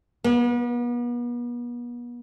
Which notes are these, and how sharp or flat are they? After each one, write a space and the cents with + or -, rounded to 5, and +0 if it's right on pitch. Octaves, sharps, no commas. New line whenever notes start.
B3 -40